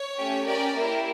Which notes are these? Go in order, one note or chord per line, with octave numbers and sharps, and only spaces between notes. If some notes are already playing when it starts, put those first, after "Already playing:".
Already playing: C#5
A3 C#4 G4
C#4 G4 A#4 D5
A#3 E4 G4 A#4